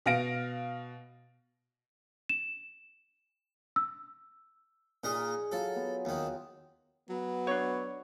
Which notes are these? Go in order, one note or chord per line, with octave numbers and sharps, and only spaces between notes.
B2 F5 A#6 D7
E7
E6
A#2 D#4 G#4 A#4 D#5
F#3 F4 A4
B3
D#2 D#3
F#3 B3
D4 D#4 C#5